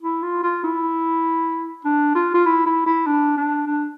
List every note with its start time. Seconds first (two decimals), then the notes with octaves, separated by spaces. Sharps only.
0.02 E4
0.23 F4
0.43 F4
0.64 E4
1.85 D4
2.15 F4
2.34 F4
2.46 E4
2.66 E4
2.86 E4
3.07 D4
3.37 D4
3.67 D4